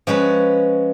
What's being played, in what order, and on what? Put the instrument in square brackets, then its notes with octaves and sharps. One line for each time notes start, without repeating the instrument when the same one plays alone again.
[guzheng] F3 G#3 C#4 B4